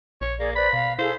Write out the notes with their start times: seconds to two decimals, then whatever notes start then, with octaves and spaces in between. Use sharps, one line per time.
0.21 A#1 C#5
0.40 A#3 G#4 A#4 D5
0.55 B4 C5 D5 B5
0.73 B2 F5
0.99 E4 G#4 A4 C5 F5